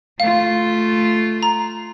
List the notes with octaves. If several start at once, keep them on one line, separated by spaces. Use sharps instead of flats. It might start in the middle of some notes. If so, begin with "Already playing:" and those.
A3 F4 F5
A#5